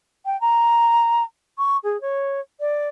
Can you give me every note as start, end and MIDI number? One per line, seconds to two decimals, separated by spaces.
0.26 0.39 79
0.41 1.23 82
1.58 1.77 85
1.84 2.00 68
2.01 2.40 73
2.60 2.88 74